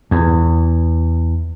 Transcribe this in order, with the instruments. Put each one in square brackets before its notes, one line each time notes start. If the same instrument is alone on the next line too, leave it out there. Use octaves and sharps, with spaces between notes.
[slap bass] E2